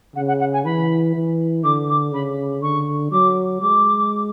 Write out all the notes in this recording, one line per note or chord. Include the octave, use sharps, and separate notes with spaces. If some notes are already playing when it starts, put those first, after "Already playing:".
C#3 F#5
F#5
F#5
G#5
E3 B5
E3
D3 D6
D6
C#3 B5
D3 C#6
F#3 D6
G#3 D6